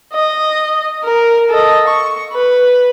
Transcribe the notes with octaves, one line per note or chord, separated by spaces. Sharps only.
D#5
A#4
A4 D#5
C#6
B4